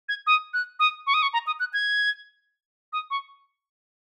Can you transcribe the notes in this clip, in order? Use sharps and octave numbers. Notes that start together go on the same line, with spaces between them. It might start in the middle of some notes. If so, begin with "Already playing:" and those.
G#6
D#6
F#6
D#6
C#6
D#6
C#6
A#5
D#6
F#6
G#6
D#6
C#6